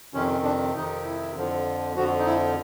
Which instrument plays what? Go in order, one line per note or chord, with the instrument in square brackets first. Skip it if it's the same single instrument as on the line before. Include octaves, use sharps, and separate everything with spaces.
[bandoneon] F2 C3 D#3 C#4
D4
F2 C3 D#3 D#4
E4
F2 D3 F3
F2 D3 F3 F#4
D#4
E4